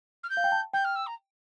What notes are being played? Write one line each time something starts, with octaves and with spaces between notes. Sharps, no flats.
F6
G6
F5
G5
A5
G5 G6
F6
E6
A#5